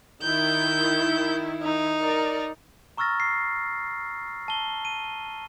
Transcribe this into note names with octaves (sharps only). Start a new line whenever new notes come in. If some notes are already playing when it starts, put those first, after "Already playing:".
D#3 E4 G6
D#4
A#4 D5
A#5 C#6 E6 F6 A6 A#6
C7
A5 G7
D#7